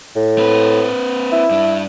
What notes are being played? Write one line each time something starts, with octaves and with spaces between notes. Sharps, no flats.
A2
C4 B4
E4
G2 D4